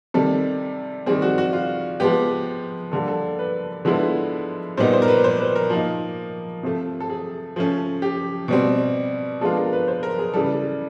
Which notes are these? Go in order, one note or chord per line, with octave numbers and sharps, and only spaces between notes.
C3 D#3 G3 A4
D#3 G3 C4 G#4
F#4
F#4
F4
F3 G#3 B3 G4
D3 G3 A#3 A4
A4
B4
D3 F3 G#3 B3 E4
A#2 G3 B3 D#4 C5
C5
A#4
B4
C5
B4
A#4
F3 A#3 D#4
C3 F3 A3
A4
G#4
F3 A3 C#4
G4
B2 G3 C4
F3 G#3 B3 D4 F4 A4
A#4
B4
C5
A#4
G#4
C#3 E3 G3 A4